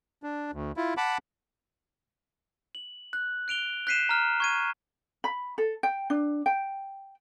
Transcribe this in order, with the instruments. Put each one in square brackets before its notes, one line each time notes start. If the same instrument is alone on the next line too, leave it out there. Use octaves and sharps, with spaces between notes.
[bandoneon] D4
D2
E4 F4
F#5 A5 B5 D6
[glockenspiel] F#7
F#6
F#6 D7 F7 G7
F#6 G6 B6 C7 D#7 E7
A#5 F6
C#6 G#6 D#7
[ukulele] B5
A4
G5
D4
G5